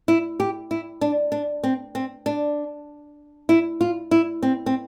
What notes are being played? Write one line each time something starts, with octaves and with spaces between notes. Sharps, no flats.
E4
G4
E4
D4
D4
C4
C4
D4
E4
F4
E4
C4
C4